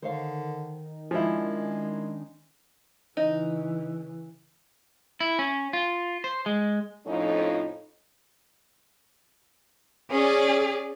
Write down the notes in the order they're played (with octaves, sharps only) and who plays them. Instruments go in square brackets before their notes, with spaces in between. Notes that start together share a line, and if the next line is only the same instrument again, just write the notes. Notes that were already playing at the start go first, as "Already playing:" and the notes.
[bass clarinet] D3 [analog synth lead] D#3 [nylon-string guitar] C5 C#5 F5
[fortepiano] F3 E4 [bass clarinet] G#3 [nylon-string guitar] C#4 D4
[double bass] C#3 E3 [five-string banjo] D#4
[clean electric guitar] E4
C#4
F4
C5
G#3
[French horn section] F2 A2 F3 C#4 D#4 F4
[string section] C#4 D5 [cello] G#4